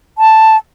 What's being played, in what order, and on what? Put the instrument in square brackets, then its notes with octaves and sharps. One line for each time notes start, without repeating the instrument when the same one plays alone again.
[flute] A5